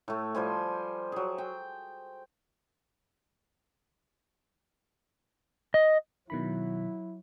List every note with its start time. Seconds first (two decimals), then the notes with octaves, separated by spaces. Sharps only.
0.08 A2 A3
0.35 F3 G3 C5 G#5
1.12 F#3 G#4
1.38 G5
5.74 D#5
6.30 B2 D#3 F#3 E4 B5